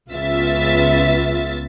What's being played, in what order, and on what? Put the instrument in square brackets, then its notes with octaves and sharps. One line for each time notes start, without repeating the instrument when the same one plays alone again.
[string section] C#2 C#3 B3 F4 E5 A6